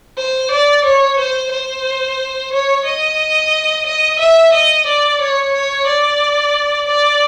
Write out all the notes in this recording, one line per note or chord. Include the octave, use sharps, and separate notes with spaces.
C5
D5
C#5
C5
C5
C#5
D#5
D#5
E5
D#5
D5
C#5
C#5
D5
D5